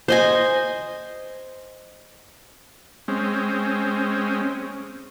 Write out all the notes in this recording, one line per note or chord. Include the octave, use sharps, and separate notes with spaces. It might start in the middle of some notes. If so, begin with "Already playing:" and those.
C5 D#5 G#5
G#3 C4 C#4